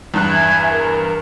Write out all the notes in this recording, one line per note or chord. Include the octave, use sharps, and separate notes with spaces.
E2 G2 F#6
E5 G#5 G#6
A#4